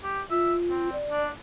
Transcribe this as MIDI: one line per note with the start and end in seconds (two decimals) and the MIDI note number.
0.03 0.21 67
0.31 0.89 65
0.31 0.54 76
0.70 0.95 60
0.93 1.28 74
1.10 1.29 62